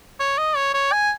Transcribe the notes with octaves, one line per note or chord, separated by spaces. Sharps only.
C#5
D#5
C#5
C#5
G#5